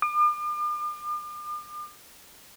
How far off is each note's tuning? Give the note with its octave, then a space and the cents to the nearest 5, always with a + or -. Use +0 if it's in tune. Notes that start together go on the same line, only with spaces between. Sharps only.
D6 +45